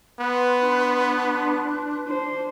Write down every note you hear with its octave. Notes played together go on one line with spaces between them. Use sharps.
B3 B4 C6 F#6
D4
D4 C5